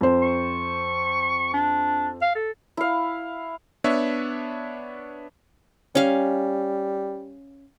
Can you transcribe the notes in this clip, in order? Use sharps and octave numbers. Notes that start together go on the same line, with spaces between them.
F2 C5
C#6
D4
F5
A4
E4 F5
B3 D4 C#5 E5
G3 C#4 F5